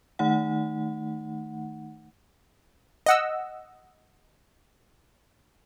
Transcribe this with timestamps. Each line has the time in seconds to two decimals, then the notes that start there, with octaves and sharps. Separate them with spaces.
0.19 D#3 A3 D#4 F#5
3.06 D#5 F#5 E6